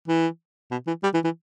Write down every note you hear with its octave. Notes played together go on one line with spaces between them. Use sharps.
E3
B2
E3
G3
E3
E3